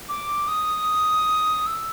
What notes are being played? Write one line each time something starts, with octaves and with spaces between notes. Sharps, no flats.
D6
D#6
E6